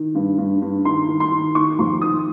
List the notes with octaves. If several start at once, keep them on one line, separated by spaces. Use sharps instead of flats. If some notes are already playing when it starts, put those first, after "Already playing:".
Already playing: D#3
G2
G2
G2
D#3 C6
D#3
C6
D#3
D#3 C#6
F2 C6
D#3 D#6